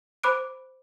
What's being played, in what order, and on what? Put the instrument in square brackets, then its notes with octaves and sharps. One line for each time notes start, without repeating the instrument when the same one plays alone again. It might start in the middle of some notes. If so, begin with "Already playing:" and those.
[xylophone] C5 B5 D6 F#6 D7